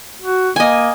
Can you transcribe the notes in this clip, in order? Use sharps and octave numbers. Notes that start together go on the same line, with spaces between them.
F#4
A#3 D#5 G#5